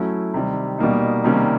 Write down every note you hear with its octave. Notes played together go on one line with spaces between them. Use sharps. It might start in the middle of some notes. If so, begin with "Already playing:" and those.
Already playing: F#3 A3 C#4 E4
C3 D#3 G3
B2 G3 A#3 D#4
C3 D#3 G3 A#3 C#4